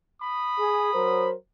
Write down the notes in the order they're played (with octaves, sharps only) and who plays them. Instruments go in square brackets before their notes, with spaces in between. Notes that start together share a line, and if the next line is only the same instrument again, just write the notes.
[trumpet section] B5 D#6
[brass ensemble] G#4
F#3 A#4 C5